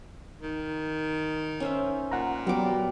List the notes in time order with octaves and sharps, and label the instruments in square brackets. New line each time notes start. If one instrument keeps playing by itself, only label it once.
[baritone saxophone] D#3
[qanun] C#4 C5 E5
[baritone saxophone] A#2 [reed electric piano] F#5 A#5
[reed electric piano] F#3 B3 F#4 [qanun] G3 D6